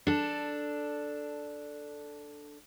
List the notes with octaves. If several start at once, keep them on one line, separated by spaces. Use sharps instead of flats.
D4 A4